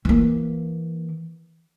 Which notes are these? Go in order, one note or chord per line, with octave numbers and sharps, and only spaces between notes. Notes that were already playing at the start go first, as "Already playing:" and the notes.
E3 A#3